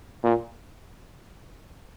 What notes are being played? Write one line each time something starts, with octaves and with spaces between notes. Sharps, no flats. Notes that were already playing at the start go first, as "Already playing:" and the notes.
A#2